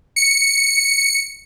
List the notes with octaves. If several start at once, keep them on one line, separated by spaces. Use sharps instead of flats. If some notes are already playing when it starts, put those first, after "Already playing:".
C#7